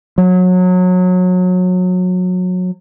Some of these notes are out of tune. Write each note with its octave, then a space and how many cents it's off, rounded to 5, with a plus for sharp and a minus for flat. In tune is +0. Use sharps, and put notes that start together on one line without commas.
F#3 -25